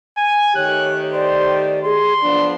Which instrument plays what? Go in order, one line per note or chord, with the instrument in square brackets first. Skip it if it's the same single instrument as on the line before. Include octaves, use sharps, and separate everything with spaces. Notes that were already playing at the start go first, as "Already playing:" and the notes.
[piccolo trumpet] G#5
[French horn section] D#3 A3 G4 [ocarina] C#5 [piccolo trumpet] F#6
[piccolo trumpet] C5 [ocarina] D5
[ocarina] G#4 [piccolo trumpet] C6
[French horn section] F3 B3 D4 [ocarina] D5